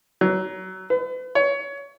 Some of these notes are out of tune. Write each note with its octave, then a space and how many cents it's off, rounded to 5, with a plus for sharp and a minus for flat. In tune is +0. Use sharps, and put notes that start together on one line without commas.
F#3 +25
B4 +40
C#5 +20